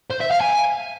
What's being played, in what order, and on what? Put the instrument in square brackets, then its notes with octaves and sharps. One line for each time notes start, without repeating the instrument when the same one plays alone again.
[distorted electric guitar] C5
E5
F5
G#5